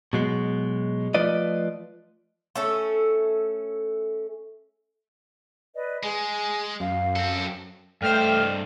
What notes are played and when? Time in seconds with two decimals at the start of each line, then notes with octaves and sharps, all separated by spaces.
0.13 B2 F#3 G#3
1.14 F3 A3 F4 B4 D5 D#5
2.56 A3 C#4 A4
5.75 B4 D5 D#5
6.03 G#3 G#4 G#5
6.80 F#2 F5
7.16 C4 A4
8.02 G2 A3 C5 G5 F6